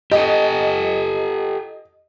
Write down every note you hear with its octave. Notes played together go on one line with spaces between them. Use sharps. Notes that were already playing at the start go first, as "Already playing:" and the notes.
G4 A4 D#5